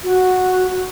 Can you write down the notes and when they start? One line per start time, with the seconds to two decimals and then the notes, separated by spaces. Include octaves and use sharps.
0.04 F#4